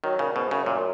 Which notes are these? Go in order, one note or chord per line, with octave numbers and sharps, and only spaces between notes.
D#3 F#3
A#2 C#3
G#2 B2
F#2 C#3
A#2